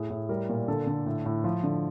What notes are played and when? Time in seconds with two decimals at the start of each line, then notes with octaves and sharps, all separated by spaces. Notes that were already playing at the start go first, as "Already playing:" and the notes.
Already playing: A2 G#4
0.10 A2
0.29 G3 A#4
0.49 A#2
0.68 D3 A4
0.87 D3
1.06 A2
1.25 A2
1.44 F3
1.63 D3